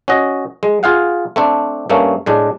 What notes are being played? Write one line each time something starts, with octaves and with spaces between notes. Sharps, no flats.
C#4 F#4 D#5
G#3
F4 G#4 F5 F#5
A3 C4 D4
G2 A3 A#3 C#4
A2 G#3 D4